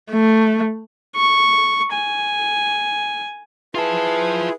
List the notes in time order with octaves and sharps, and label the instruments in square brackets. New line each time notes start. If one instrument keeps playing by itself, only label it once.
[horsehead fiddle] A3
[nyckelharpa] C#6
G#5
[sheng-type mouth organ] E4 G#4 [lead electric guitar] F4 A5 [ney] B4